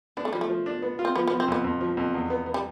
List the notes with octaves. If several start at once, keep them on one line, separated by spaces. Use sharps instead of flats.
B3 D4
A3
F3 G3
A3
F3
D4
B3
F4
C4
F3 B3
B3
F3
C4
F2 B3
F2
F3
F2
E2
B3
B3
G3